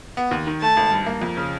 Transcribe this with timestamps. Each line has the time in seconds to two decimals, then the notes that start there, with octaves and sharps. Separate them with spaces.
0.17 B3
0.31 D#2
0.47 D#3
0.61 A3 A5
0.77 G#1
0.92 G2
1.07 A#3
1.22 F2
1.37 C#3